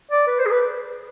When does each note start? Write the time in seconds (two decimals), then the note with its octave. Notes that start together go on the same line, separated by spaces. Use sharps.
0.11 D5
0.27 B4
0.39 C5
0.45 G#4
0.51 B4